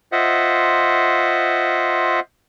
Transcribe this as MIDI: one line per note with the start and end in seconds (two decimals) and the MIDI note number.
0.12 2.20 65
0.12 2.20 72
0.12 2.20 75
0.12 2.20 76
0.12 2.20 78